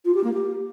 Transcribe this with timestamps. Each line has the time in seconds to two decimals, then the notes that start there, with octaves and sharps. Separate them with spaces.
0.05 F4
0.14 G4
0.24 A#3
0.33 G4